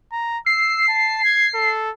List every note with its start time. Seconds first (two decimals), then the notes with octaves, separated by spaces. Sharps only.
0.12 A#5
0.46 E6 C7
0.88 A5
1.24 G#6
1.54 A4